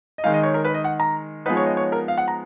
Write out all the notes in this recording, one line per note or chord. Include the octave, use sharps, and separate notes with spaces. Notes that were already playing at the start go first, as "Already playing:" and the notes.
D#5
D#3 G#3 D#4 F5
D#5
C#5
A#4
B4
D#5
F#5
A#5
F3 G#3 B3 D#4 B4
C#5
D#5
C#5
A#4
F5
F#5
A#5